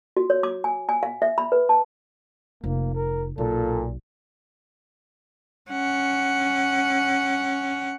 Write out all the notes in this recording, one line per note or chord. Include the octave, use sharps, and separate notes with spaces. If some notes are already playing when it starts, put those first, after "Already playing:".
F#4
C#5
D6
G#5
G#5
F5
E5
B5
B4
A5
F1 A#3
A#4
B1 A#2 A4
C#4 F#5